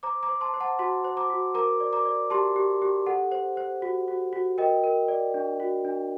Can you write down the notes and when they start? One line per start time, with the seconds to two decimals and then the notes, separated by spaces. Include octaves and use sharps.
0.03 C5 A#5 D6
0.23 A#5 D6
0.29 C5
0.41 A5 C6
0.54 C5
0.60 F#5 A5
0.79 F#4 A5 C6
1.04 C5
1.17 A#5 D6
1.30 F#4
1.54 A#4 A#5 D6
1.80 D5
1.93 A#5 D6
2.05 D5
2.30 G4 A5 C6
2.56 G4
2.82 G4
3.06 A4 F#5
3.32 C5
3.57 C5
3.82 F#4
4.08 F#4
4.33 F#4
4.58 A#4 D#5 G5
4.84 A#4
5.08 D5
5.34 D4
5.60 F#4
5.85 D4